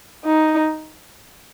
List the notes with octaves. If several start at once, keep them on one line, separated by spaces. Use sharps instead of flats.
D#4